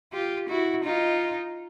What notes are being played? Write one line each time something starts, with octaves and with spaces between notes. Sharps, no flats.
F4 G4
E4 F#4
D#4 F4